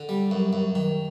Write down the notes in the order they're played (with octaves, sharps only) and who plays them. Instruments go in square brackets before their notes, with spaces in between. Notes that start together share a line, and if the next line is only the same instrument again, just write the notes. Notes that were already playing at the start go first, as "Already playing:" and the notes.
Already playing: [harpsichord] D3
G3
F#2
F#2
D#3